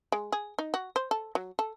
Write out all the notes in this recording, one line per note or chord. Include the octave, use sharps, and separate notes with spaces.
G#3
G#4
D#4
F#4
C5
A4
F#3
A4